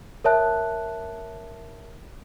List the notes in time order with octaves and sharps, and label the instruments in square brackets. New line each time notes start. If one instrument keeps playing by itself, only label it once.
[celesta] A#4 C#5 E5 A5 F#6